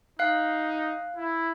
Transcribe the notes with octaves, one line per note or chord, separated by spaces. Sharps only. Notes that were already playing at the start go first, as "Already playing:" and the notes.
D#4 F5 F#6
E4